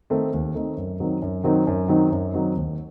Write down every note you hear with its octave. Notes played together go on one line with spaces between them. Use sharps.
D#3 A3 C4 D#4
D#2
D#3 A3 C4 D#4
F#2
D#3 F#3 C4 D#4
F#2
D#3 F#3 C4 D#4
F#2
D#3 F#3 C4 D#4
F#2
D#3 F#3 C4 D#4
D#2